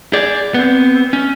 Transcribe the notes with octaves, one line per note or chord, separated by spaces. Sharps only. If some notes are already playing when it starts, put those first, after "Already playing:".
G#4 D5
B3 C4
C#4